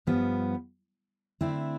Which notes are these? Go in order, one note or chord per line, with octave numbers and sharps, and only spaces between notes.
G2 F3 B3
D3 A3 C4 E4